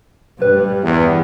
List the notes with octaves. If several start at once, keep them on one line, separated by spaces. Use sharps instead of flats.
G2 G3 B4
E2